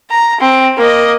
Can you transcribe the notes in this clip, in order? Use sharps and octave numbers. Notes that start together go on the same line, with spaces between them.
A#5
C4
A#3 D#5